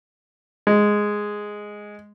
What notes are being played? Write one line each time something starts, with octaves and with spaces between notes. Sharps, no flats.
G#3